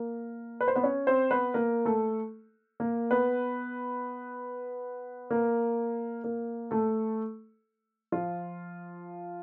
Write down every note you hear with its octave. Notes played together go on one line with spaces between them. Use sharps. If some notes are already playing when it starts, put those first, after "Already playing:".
Already playing: A#3 A#4
B4
C5
B3 B4
C#4 C#5
C4 C5
B3 B4
A#3 A#4
A3 A4
A#3 A#4
B3 B4
A#3 A#4
A#3 A#4
A3 A4
F3 F4